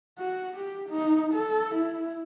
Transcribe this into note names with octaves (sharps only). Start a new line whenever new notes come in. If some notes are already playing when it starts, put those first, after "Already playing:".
F#4
G4
D#4
A4
E4